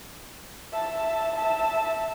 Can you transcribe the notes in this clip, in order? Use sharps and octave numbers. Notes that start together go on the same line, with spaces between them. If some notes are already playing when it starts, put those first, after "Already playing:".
E5 A5
E5 A5